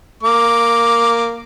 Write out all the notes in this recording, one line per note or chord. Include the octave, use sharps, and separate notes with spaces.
A#3 D6